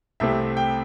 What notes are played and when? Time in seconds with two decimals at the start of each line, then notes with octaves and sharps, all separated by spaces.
0.20 C2 C3 A3 C4 E5
0.57 G5